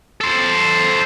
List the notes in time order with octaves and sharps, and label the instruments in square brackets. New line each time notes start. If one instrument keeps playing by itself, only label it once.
[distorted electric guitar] A4 C5